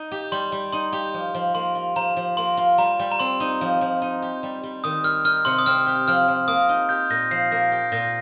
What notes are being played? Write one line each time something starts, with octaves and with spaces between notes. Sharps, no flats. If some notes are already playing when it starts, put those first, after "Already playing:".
Already playing: D#4
G4
G3 C6
G3
D#4 C6
G4
F3
F3
A#3 C6
F4
F3 A#5
F3
A#3 C6
F4
G3 A#5
G3
A#5
C4 C6
D#4
F3
F3
D#4
G4
G3
G3
D#3 D#6
G3 F6
D#4 F6
C3 C6
D#6
C4 F6
G4
F3 F6
F3
A#3 D#6
D#4
G4 G6
A#2 A#6
F3 C7
A#3 A#6
G4
A#2 A#6